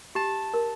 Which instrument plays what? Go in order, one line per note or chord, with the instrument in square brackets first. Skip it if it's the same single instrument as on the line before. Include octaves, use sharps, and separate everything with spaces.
[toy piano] G4 [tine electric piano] A5
[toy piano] A#4